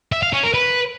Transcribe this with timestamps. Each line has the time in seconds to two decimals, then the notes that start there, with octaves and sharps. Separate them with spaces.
0.12 E5
0.23 F5
0.33 C#4
0.44 A#4
0.54 B4